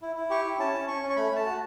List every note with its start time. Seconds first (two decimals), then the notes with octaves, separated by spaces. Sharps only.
0.02 E4
0.16 E4
0.30 G4 C#6
0.45 E4
0.59 C#4 A5
0.73 C#4
0.88 C#4 C#6
1.02 C#4
1.10 C#6
1.16 A3 B5
1.31 A3 A5
1.46 F#4